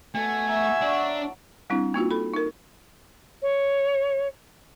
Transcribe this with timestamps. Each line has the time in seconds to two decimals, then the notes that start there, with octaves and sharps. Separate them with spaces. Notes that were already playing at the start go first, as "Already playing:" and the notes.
0.15 B2 A3 G#5
0.48 F#4 A4 E5 A#5
0.81 F#3 D4 C#6
1.70 G3 C4 D4 E4
1.94 A#3 D#4 F4 F#4
2.11 A4 B5
2.34 D#4 A#4
3.42 C#5